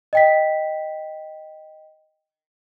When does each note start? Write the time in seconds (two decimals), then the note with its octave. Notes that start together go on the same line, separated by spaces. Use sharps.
0.13 D#5 G5 B6